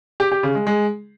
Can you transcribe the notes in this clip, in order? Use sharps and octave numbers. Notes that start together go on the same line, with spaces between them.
G4
G4
C#3
G#3
G#3